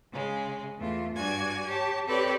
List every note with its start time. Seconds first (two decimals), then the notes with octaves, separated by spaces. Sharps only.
0.12 C#3 G#3
0.77 E2 A3 F4
1.15 G2 F#4 D5 G#5 G#6
1.66 G4 C#5 A5
2.06 C4 G4 A4 B4 C#5 D5